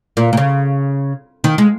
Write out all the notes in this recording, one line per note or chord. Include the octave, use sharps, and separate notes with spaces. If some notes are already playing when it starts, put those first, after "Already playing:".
A#2
A#2
C#3
D#3
G#3